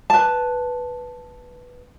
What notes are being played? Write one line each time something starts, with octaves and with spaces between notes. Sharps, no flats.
B4 A5